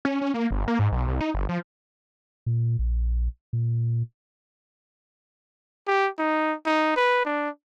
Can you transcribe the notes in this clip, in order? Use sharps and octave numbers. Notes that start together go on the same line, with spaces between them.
C#4
C#4
A#3
G1
A#3
G#2
B1
C2
D#4
G1
F3
A#2
A#1
A#2
G4
D#4
D#4
B4
D4